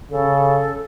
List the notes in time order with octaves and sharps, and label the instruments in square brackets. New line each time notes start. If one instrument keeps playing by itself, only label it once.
[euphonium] C#3 [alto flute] A4